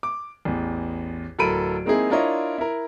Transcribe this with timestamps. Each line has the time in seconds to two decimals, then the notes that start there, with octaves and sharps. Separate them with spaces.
0.03 D6
0.45 A1 E2
1.39 D1 A4 A#4 B5 D7 D#7
1.85 G#3 A#3 C4 D#4 E4 G#4
2.10 D4 E4 F4 A#4 C#5 D#5
2.58 E4 A#4